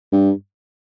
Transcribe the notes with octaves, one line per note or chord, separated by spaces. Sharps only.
G2